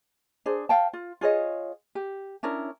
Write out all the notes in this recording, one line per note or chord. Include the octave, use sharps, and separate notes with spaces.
D4 G#4 C5
F5 G5 A5
F4
F4 G#4 C#5 D#5
G4
C#4 D4 E4 A#4